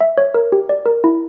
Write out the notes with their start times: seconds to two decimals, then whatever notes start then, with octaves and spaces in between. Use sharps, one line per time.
0.01 E5
0.18 C#5
0.34 A#4
0.52 G4
0.69 D5
0.86 A#4
1.04 E4